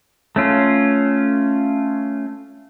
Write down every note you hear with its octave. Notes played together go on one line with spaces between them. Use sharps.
A3 C#4 F4